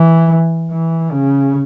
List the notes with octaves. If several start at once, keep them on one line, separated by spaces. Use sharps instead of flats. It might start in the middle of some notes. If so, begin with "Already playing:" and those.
Already playing: E3
E3
C#3